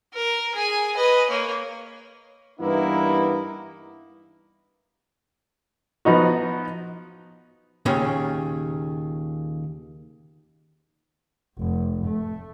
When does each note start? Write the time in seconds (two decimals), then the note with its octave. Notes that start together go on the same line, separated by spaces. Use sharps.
0.14 A#4
0.55 G#4 G#5
0.97 B4 D#5
1.30 A#3 C#5
2.60 G2 E3 A#3 B3 D#4 E4
6.05 F3 B3 D#4 F#4
7.86 D#2 A#2 C#3 C#5
11.58 F1
12.06 A3